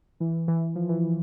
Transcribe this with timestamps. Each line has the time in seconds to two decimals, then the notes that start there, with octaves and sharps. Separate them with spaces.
0.20 E3
0.48 E3
0.76 F3
0.89 E3
1.03 E3